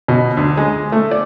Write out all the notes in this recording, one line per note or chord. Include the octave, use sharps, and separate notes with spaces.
B2
D2
G#3
A3
D5